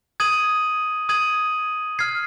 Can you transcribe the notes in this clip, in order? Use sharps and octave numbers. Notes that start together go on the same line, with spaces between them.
D#6 G#6 D#7 F#7
D#6 G#6 D#7 F#7
F6 G#6 C7